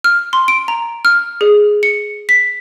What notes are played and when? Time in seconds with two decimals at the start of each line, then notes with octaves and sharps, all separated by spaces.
0.04 F6
0.33 C6
0.48 D7
0.68 A#5
1.05 F6
1.41 G#4
1.83 C#7
2.29 B6